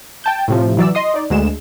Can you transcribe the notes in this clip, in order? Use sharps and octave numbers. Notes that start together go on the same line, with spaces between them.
G5 A5 G6
A2 C3 F3
E3 F#3 D5 E6
D#5 C6 D#6
D#4 D5
D2 G#3 E7